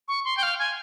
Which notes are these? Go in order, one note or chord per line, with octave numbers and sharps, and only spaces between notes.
C#6
C6
G5
F5
G#5